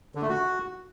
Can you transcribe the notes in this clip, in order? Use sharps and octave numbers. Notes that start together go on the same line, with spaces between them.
D3
A3
F#4